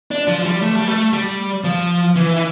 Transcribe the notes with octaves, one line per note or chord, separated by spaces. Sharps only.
D4
F3
G3
A3
G3
A3
G3
F3
E3
E3